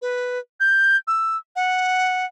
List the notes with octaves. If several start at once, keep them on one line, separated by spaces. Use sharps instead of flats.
B4
G6
E6
F#5